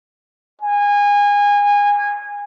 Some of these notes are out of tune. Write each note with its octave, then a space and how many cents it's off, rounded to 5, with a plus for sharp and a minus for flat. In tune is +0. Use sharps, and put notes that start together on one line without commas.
G#5 -25